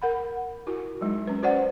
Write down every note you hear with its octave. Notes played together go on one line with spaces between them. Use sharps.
A#4 F#5 B5
E4 F#4 A#4
F#3 G#3 D#4
C#4 B4
F#4 B4 C5 D5 F#5